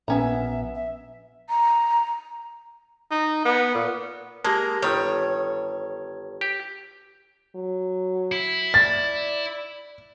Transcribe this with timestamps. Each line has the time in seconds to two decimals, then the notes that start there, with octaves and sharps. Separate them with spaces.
0.08 A#1 B3 C#4 E5 A#5
0.75 E5
1.49 A#5
3.11 D#4
3.45 B3
3.75 A#2
4.45 G#3 A#3 G4 A#4 A5
4.82 G1 D#3 G3 C#5
6.41 G4
7.55 F#3
8.32 E4
8.74 D5 A6